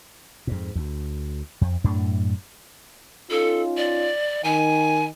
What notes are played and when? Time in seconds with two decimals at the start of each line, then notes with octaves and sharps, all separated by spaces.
0.47 F2 G#2
0.75 D2
1.61 F2
1.84 F#2 A2 A3 D4
3.30 C#4 D#4 F4 A4
3.77 D5
4.44 D#3 G#5